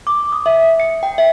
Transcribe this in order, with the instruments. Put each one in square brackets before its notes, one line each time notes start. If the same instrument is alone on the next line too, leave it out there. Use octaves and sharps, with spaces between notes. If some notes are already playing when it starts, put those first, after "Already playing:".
[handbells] D6
D#6
E5
C#7
G5
E5